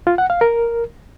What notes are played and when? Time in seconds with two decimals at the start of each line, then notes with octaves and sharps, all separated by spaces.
0.07 F4
0.18 F#5
0.30 F5
0.41 A#4